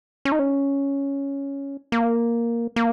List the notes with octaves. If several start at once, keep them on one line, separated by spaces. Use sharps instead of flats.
C#4
D#4
C#4
A#3
A#3